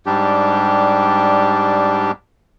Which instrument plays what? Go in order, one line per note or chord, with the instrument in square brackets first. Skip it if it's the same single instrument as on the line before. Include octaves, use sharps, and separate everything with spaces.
[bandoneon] G#2 G3 D4 G4